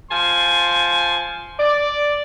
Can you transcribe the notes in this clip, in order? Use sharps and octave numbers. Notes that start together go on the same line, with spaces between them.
F3 G#5 A5 C6
D5